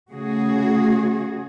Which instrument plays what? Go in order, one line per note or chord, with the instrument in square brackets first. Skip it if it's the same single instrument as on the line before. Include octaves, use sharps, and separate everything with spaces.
[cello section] C#3 A3 F#4 G#4